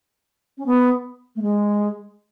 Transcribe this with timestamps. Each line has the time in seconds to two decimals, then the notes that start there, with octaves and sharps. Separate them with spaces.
0.58 C#4
0.66 B3
1.36 A3
1.42 G#3